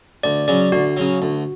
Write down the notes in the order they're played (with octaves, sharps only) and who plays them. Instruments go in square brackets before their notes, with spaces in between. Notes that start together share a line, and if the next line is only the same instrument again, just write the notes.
[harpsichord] D2 [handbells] D5
[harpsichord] C#3 F#3 [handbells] D5
[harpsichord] D2 [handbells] F#4
[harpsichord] C#3 F#3
D2